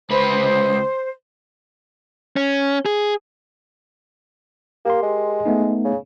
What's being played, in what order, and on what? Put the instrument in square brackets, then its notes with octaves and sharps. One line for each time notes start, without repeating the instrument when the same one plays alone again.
[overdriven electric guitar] C#2 B4 [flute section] C5
[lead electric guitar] C#4
G#4
[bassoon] A#3 [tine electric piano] G4 A#4 C6
[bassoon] G#3
[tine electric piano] A3 B3 D#4
[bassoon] C#3